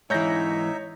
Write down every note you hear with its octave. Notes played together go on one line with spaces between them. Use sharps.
G#2 E3 D#4 C#5 E5 G6 A#6